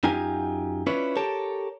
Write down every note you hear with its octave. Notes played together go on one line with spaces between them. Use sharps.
F#2 D#4 F4 G4 G#5
C#4 D4 E4 F4 B4 C#5
G4 A4 A#4 C#5 A5